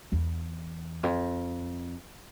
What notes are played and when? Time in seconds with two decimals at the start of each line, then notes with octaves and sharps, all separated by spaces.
0.12 E2
1.03 F2